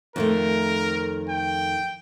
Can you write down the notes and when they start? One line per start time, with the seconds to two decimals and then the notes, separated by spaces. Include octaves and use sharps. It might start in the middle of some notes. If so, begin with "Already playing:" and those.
0.16 F2 D#3 A3 A#4
1.30 G5